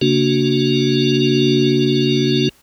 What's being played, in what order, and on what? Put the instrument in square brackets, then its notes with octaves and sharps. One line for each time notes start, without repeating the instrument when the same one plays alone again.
[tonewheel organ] C#3 A#3 D4 F#4